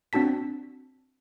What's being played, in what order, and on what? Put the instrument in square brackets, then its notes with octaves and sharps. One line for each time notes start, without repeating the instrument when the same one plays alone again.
[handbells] C4 D4 F#4 A5 B6